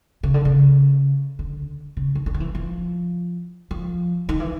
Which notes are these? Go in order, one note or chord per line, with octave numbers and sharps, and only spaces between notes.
C#3
D3
C#3
D3
C#3
D#3
D3
F3
E3
F3
F3
D#3
E3